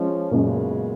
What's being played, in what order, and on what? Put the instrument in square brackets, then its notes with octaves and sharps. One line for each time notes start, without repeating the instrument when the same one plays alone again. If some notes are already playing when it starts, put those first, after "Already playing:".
Already playing: [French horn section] F3 G#3 C#4
[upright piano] F#2 A#2 [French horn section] C#3 G#3 B3